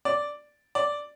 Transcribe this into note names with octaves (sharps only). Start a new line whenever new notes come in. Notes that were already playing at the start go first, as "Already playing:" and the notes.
D5
D5